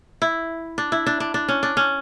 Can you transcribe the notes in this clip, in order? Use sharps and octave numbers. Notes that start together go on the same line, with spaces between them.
E4
D4
E4
D4
D4
D4
C#4
D4
C#4